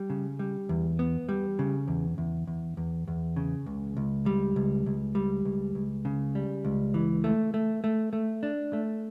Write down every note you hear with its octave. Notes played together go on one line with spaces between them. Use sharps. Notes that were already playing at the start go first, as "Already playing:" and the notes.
Already playing: G3
C#3
G3
E2
B3
G3
C#3
E2
E2
E2
E2
E2
C#3
C#2
C#2
G3
C#2
C#2
G3
C#2
C#2
C#3
G3
C#2
E3
A3
A3
A3
A3
D4
A3